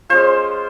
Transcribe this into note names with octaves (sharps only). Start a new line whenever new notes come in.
G#3 C#4 F4 C5